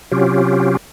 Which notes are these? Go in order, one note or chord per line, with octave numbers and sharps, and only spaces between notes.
C3 F#3 C#4 F4 G4